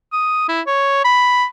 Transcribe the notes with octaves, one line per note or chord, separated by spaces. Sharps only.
D#6
E4
C#5
B5